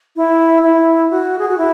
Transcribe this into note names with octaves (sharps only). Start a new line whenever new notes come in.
E4
E4
F#4
G#4
F#4
E4